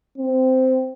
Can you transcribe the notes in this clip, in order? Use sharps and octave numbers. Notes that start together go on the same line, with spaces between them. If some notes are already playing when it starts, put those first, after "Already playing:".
C4